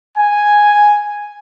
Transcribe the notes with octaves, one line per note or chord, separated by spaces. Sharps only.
G#5